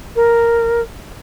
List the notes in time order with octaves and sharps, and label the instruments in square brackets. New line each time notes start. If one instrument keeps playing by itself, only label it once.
[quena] A#4